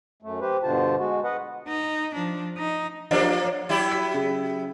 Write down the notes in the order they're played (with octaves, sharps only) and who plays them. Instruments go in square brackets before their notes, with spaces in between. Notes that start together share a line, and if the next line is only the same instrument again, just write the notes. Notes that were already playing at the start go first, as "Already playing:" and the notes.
[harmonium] F#2 A3
G4 B4 C5
G2 B2 D3 F4 C5 A5
G#3 F#4
B4 D#5 F#5
[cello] D#4
F3 D4
D#4
[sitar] F3 A#3 D4 [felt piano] G4 C5 D#5
[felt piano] C#5
[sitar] F#3 E4 G4
[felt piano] B6
C#3